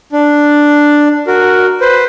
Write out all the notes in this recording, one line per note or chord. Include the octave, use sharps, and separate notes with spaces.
D4
F#4 A#4
B4 C5